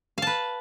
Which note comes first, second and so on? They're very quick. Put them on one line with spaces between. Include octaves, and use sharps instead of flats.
F5 A5 B4